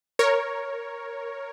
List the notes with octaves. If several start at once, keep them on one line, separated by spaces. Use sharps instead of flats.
A#4 C#5